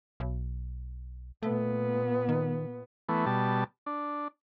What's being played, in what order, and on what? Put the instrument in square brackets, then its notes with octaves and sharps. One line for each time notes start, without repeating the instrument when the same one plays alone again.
[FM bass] B1
[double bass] A#2 B3 [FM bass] A3
[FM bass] D#3
[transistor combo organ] E3 A3 B3
B2 G3 A5
D4